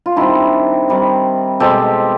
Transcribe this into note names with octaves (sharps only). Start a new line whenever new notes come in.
F4
D#3 G3 C4 D4 E4
D#3 G3 C4
B2 G#3 C4 G4 A4